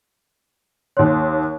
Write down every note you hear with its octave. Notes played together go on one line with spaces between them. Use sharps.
D#2 C#5 C6